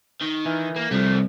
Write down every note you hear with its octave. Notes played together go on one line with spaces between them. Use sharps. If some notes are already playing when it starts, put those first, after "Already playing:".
D#3
E3
A#3
C2 F3 A3